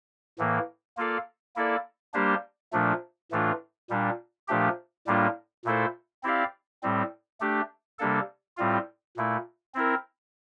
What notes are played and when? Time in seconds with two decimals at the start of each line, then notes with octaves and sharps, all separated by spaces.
0.39 A2 E3 A#3
0.97 A#3 F4 A4 D5 F5
1.56 A#3 E4 A4 D5
2.14 G3 A#3 D4 G4 C5
2.73 A#2 F3 A3 D4
3.31 A2 E3 A3 D4 F4
3.90 A#2 G3 D4
4.48 A#2 F3 A3 D4 G4
5.07 A2 G3 A#3 D4 F4
5.65 A#2 A3 E4 A4 C5
6.23 C4 E4 G4 D5 F5
6.83 A2 G3 C4
7.41 A3 D4 G4
7.99 C3 G3 A#3 D4 A4
8.57 A2 G3 C4 F4
9.17 A#2 A3 E4
9.74 C4 E4 A#4